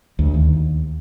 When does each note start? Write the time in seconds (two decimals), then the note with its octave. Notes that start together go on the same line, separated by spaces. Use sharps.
0.19 D2
0.34 D#2